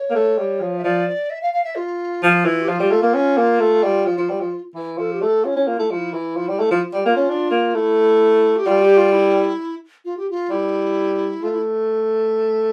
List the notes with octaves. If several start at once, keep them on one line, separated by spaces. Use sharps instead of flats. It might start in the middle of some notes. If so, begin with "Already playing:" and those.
Already playing: C#5
A#3
A3
G3
F3
E5
F3 D5
E5
F5
F5
E5
F4
F3
E3
G4
F3 F4
G3
A3
A#3
C#4
A#3
A3
G3
F3
F3
G3
F3
E3
F3 A4
G4
A3 A4
C#4 F4
C#4 E4
A#3 F4
A3 E4
F3 E4
E3
F3
G3
A3
F3
F4
G3
A#3 F4
C#4
D4
A#3
A3 E4
G4
G3 F4
G4
F4
E4
F4
G4
F4
G3 E4
A3 F4
E4